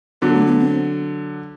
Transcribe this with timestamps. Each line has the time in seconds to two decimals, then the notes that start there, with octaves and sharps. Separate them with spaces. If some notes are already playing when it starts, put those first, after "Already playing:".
0.22 D3 F#3 B3
0.34 A3
0.47 B3
0.59 C4